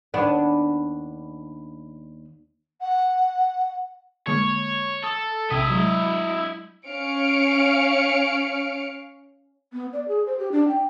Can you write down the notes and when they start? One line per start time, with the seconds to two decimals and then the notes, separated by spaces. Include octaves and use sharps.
0.14 D#2 B3 D4
2.81 F#5
4.28 D3 G#3 A#3 C#5
5.04 A4 D#6
5.51 A#1 C3 E4 D#5 B6
5.70 F#3 G#3
6.87 C#4 F5 F6 C#7 D7
9.73 B3
9.93 D5
10.08 G#4
10.26 C5
10.39 G4
10.52 D4
10.68 G5